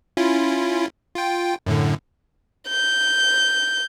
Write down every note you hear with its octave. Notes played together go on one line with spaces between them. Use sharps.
C#4 E4 F4
F4 G5
F#2 A2 D3
G6